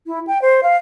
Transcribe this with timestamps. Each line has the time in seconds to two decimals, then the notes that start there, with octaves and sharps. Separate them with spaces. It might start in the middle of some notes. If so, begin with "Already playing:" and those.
0.07 E4
0.27 G5
0.42 C5
0.63 F5